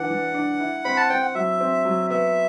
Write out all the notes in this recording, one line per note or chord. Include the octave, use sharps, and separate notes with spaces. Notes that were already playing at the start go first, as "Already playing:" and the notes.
Already playing: E3 D4 F#5
E3
D4
E4
C4 B5
A5
C4 G5
F#5
F#3 E5
C4
F#3
B3 E5